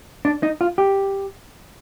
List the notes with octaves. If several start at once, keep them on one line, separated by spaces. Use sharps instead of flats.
D4
D#4
F4
G4